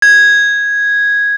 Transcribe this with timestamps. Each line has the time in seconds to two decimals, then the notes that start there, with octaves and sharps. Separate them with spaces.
0.02 G#6